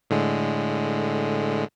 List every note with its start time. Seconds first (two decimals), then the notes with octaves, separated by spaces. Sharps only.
0.10 A2 D3 G#3